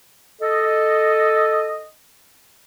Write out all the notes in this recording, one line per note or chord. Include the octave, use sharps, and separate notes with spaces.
A4 D#5